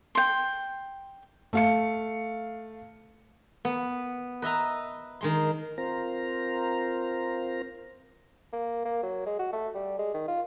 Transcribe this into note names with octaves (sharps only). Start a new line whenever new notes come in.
G5 C6
A3 F5 C#7
B3
B4 D#5 E5 A#5
D#3 G#3 C6
C4 F4 A#4 C5 A#5
A#3
A#3
F#3
G#3
F#4
A3
G3
G#3
D#3
F4